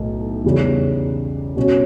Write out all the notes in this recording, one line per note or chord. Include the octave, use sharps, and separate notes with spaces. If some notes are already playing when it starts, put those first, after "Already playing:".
Already playing: B1 A2
E2 C#3 G3 C#4
B2 G3 C#4 F#4